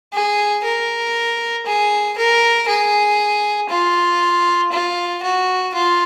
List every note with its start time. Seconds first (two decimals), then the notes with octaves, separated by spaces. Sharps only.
0.14 G#4
0.64 A#4
1.66 G#4
2.17 A#4
2.68 G#4
3.69 F4
4.72 F4
5.23 F#4
5.74 F4